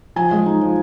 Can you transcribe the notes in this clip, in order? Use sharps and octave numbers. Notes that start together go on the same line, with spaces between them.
F3 G#5
G#3
D#4
F3